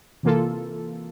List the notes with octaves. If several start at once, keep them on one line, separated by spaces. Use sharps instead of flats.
C3 E3 A#3 F4 A4